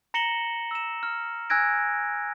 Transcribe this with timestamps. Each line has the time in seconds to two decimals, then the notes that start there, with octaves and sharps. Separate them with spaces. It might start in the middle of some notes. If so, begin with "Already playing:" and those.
0.14 A#5 A#6 C#7 E7 F#7 G7
0.71 E6 E7
1.03 F6
1.50 G#5 E6 F#6 G#6 A#6 D7